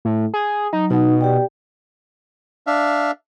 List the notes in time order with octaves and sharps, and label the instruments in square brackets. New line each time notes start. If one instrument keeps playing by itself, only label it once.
[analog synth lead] A2
G#4
[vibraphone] F#3 [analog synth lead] D#4
[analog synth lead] B2 [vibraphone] D#4 F#5
[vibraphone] G4 D5 G5
[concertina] D4 E5 F5